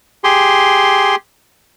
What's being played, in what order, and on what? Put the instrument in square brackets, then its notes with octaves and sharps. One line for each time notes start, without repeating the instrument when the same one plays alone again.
[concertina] G4 G#4 C6